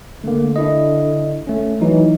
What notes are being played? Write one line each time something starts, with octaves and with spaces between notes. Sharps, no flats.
D3 A3 A#3
D4 E4 D#5
A3 C#4
E3 F#3 D#4